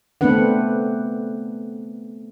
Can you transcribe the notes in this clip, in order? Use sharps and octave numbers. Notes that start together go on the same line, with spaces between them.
A3 B3 C4 D4 B4 F#5